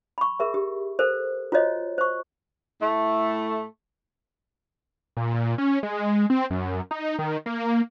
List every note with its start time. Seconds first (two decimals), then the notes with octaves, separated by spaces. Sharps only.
0.18 B5 C#6
0.40 G#4 A#4 E5
0.54 G4
0.99 A4 A#4 C5
1.52 F4 F#4 C5 C#5 D#5
1.98 C5 C#6
2.81 A2 A3
5.17 A#2
5.34 A#2
5.58 C#4
5.83 G#3
6.30 C4
6.50 F#2
6.91 D#4
7.19 D#3
7.46 A#3